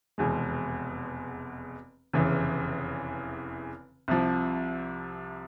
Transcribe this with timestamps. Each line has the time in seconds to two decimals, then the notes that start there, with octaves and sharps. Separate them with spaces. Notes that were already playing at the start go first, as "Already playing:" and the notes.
0.18 F1 E2 B2 G#3
2.13 F1 E2 C#3 E3
4.08 C2 C3 F3